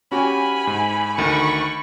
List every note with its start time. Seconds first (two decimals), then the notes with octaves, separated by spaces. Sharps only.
0.12 C#4 F#4 G4 G#5 B5
0.67 G#2
1.18 D2 D#3 B5 C#6